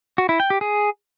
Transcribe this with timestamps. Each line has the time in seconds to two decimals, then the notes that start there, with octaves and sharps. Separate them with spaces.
0.18 F#4
0.29 E4
0.40 G5
0.50 G4
0.61 G#4